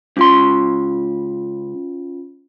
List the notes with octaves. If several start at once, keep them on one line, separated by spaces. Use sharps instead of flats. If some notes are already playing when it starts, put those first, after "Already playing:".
C#2 C#4 F4 C6